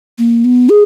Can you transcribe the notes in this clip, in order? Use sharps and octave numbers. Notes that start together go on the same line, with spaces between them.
A#3
B3
G#4